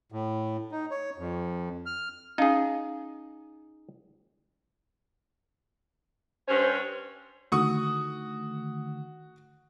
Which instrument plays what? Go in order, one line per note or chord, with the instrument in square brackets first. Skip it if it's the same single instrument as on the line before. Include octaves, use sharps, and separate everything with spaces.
[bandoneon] A2
D#4
C#5
F2
F6
[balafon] C#4 F5 [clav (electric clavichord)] D#4 G#4
[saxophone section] G2 C#4 [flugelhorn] C5
[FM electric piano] D3 D#3 A3 [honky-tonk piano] F#4 C#6 D#6